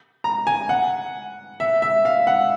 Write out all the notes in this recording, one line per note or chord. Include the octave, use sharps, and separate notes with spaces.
A#5
G#5
F#5
E5
E5
F5
F#5